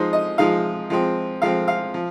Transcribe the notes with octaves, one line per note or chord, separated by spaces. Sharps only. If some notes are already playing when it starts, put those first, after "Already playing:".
Already playing: F3 G#3 D#4 C5
D#5
F3 G#3 D#4 F5
F3 G#3 C4
F3 G#3 C4 F5
F5
F3